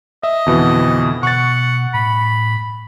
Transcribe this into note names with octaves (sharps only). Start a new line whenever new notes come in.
D#5 E5
F2 B2 D3 E3
B2 F#5 C#6 A6
A2 B5